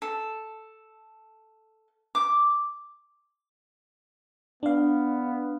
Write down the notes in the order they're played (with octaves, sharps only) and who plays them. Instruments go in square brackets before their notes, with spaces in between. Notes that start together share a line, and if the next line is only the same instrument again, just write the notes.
[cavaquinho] A4
D6
[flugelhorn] B3 [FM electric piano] D4 F5